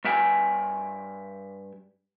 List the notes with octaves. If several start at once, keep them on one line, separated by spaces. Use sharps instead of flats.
G2 E5 G5 G#5